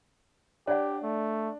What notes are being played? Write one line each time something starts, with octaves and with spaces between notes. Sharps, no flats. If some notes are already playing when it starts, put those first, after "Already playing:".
D4 G4 C#5 D5 F#5
A3